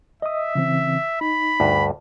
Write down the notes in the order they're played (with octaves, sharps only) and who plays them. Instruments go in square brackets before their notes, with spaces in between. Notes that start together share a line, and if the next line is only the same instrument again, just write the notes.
[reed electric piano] D#5 D#6 [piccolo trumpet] E5
[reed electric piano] C#3 E3 C4
[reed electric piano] D#4 [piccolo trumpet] B5
[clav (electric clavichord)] D2 G2